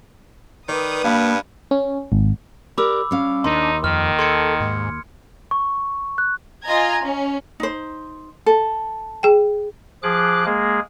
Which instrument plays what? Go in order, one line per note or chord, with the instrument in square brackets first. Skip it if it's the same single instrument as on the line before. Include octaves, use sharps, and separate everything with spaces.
[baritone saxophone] D#3 [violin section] B4 D#6 [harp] D5
[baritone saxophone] G2 [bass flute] A#3 [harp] F5 B5
[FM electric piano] C#4
G#1
[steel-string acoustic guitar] G4 A#4 D5 [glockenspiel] B5 D6 E6
[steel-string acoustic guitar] G3 C#4 F5
[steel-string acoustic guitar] D#2 [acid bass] D4 [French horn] D#4 [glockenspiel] C6
[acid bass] F2 [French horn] D#3 [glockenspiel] F6
[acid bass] A4 [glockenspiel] C6 G#6 C#7
[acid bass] G#2
[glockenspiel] C#6
F#6
[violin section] F4 D#5 G#5 A#5 G#6
C#4
[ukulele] D#4 C5
A4
[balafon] G#4 G5
[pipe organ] F3 G#4 D6 F#6
G#3 A#3 G#4